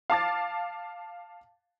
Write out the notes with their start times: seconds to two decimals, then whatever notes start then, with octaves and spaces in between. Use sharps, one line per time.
0.10 F5 A5 D6 A6